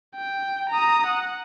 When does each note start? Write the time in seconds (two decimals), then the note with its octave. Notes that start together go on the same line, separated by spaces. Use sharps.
0.16 G5
0.70 A#5 D#6
1.06 F#5